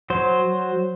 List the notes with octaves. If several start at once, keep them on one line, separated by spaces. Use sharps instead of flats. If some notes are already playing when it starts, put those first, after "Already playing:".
F#3 C5